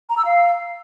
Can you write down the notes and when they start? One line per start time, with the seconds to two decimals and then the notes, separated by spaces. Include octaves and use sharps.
0.09 A#5
0.17 E6
0.25 F5